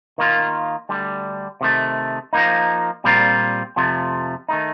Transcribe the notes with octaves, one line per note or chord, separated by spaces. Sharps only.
D#3 A#3 F4
D2 D3 G3
C3 D#3 A3
F3 A#3 D#4
A#2 G3 C4 F4 A#4
F2 C3 F3 A3
D#3 A3 D#4